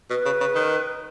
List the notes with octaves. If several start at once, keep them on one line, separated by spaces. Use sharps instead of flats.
B2 B4
C#3
C#3
D#3